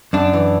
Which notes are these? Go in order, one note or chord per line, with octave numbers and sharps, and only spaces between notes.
F#2 D4
E3